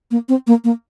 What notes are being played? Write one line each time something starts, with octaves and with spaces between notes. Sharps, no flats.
A#3
C4
A#3
A#3